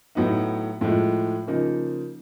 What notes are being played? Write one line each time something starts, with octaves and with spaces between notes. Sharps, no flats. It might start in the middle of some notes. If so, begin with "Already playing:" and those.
A2 F#3 B3 D#4
A2 F3 G#3
C#3 F3 A#3 D#4